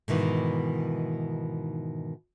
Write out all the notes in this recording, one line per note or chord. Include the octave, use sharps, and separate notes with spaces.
G#2 B2 D#3 E3